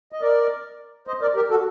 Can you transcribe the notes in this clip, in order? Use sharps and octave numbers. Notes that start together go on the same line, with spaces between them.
D#5
A#4 D5
C5 D#5
A#4 D5
G4 A#4
F#4 A4